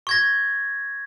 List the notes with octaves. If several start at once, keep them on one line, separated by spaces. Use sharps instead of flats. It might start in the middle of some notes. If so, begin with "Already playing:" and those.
C#6 G#6 A#6